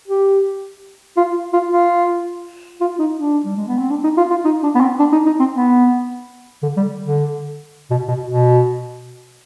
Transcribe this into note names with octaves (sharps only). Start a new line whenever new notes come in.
G4
F4
F4
F4
F4
D#4
D4
G3
G#3
B3
C4
D4
D#4
F4
F4
D#4
D4
B3
C4
D4
D#4
D#4
C4
B3
D3
G3
D3
B2
B2
B2